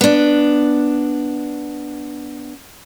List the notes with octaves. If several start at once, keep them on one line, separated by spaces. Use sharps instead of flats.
B3 D4